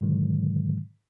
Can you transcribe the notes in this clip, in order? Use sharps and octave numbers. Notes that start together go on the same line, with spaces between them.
G#2 B2 D3 D#3 F#3 G#3